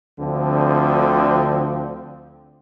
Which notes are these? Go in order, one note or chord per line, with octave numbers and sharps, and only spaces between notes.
D2 D3 F3 C4